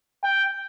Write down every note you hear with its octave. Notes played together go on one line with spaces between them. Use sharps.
G5